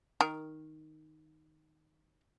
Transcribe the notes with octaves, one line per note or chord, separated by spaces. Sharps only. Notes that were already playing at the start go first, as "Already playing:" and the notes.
D#3 A#4